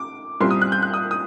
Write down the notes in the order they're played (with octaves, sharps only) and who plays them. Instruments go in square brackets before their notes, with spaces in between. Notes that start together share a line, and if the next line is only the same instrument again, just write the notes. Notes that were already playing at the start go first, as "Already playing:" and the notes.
Already playing: [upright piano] D6
C2 A#2 G3 C4 C6
D#6
F#6
G6
F#6
D#6
D#6